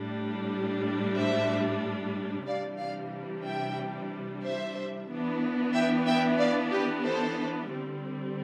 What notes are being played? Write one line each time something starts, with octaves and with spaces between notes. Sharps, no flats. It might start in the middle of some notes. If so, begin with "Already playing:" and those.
Already playing: A2 G3 D4
C5 E5
C3 E3 G3 D4 D5 F5
D5 F5
E5 G5
C5 E5
E3 B3 D4
E5 G5
E5 G5
D5 F5
G4 B4
A4 C5
D3 G3 C4